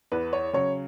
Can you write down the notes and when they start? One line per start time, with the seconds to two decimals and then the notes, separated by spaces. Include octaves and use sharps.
0.12 E2 B4
0.33 C#5
0.53 C#3 F#3 C#5